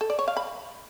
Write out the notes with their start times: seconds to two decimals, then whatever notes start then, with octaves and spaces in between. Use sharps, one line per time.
0.01 A4
0.10 D5
0.19 C#5
0.28 F5
0.37 B5